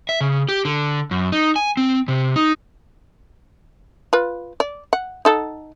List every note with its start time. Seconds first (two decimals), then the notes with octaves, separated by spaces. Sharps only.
0.09 E5
0.21 C#3
0.49 G4
0.65 D3
1.11 F#2
1.32 D#4
1.56 G#5
1.77 C4
2.08 C3
2.36 D#4
4.13 F4 B4
4.60 D5
4.93 F#5
5.25 D#4 A4 F#5